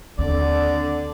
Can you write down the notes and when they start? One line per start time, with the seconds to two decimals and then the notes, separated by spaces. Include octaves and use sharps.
0.18 D#2 D3 C4 D5